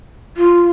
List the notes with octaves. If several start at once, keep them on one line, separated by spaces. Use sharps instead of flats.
F4